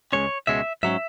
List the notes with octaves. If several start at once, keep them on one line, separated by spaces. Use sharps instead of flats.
C#2 B2 G#3 C#4 C#5
C#2 B2 G#3 C#4 E5
G#2 F#3 C#4 E5